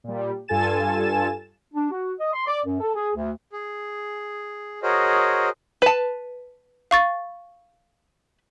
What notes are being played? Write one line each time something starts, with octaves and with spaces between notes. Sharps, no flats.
A#2 G3
G2 F4 A4 G#5 A6 E7
D4
F#4
D#5
C6
D5
F#2
A4
G#4
D2
G#4
F#4 G#4 A#4 C5 C#5 D#5
B4 A5
F5 C#6 A6